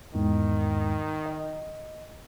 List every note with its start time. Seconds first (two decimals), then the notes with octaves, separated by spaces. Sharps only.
0.14 E2 G#2 D#3 G#3
1.26 D#5